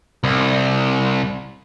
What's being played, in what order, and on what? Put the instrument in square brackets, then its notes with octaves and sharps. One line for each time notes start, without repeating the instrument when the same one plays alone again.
[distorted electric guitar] C2